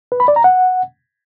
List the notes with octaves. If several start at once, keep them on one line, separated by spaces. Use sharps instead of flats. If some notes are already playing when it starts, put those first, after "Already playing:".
B4
B5
D5
A#5
F#5